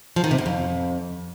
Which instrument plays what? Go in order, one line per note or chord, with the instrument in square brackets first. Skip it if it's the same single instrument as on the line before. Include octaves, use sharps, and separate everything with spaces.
[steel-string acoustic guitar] F3
D#3
C3
B2
F2